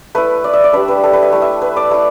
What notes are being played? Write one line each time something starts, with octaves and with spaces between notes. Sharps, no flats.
A3 E4 B4
D5
E5
D5
G3 D4 B4
B4
A4
B4
E5
A3 E4
E5
B4
D5
A3 E4